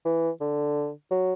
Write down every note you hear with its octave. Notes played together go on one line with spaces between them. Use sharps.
E3
D3
F#3